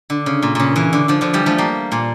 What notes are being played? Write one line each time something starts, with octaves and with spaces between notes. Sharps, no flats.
D3
C#3
A#2
A#2 C#3
C#3 E3
D3
D3 F3
D3 F3
E3 G3
F3 A3
G3 A#3
A#2